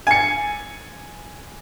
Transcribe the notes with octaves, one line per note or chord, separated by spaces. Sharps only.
G#5 C#7